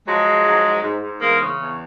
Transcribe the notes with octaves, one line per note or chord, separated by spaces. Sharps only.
F3 F#3 G#3
F3
G#2
G#2
G#2
G#2
E2 G#3 A#3
C#3
E2